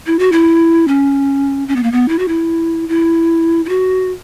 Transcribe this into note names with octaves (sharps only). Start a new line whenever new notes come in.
E4
F#4
E4
C#4
C#4
B3
A#3
B3
E4
F#4
E4
E4
E4
F#4